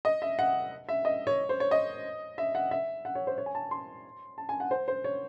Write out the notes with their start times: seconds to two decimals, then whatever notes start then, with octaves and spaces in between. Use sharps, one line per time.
0.05 D#5
0.22 E5
0.39 F#5
0.89 E5
1.05 D#5
1.27 C#5
1.49 C5
1.60 C#5
1.71 D#5
2.38 E5
2.55 F#5
2.71 E5
3.05 F#5
3.15 C#5
3.27 C5
3.38 C#5
3.46 G#5
3.55 A5
3.71 C6
4.38 A5
4.49 G#5
4.60 F#5
4.71 C5
4.88 C5
5.04 C#5